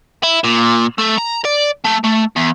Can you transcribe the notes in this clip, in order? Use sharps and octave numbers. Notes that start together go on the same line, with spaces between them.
E4
A#2
A3
A#5
D5
A3
A3
E2